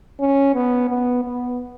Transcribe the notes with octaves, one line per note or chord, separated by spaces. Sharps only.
C#4
B3
B3
B3